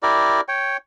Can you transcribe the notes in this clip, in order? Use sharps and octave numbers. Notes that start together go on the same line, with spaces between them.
E4 G4 A#4 D5
C#5 G5